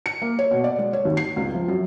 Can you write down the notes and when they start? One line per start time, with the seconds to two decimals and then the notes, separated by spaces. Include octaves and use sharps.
0.06 C#7
0.22 A#3
0.39 C#5
0.51 B2
0.64 D5
0.79 G#3
0.93 C#5
1.05 D#2
1.17 C7
1.36 C#2
1.54 F3
1.68 F#2